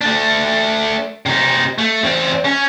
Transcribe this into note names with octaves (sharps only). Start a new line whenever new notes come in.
A3 D4
C3 D#4
A3
E2 C4
C#4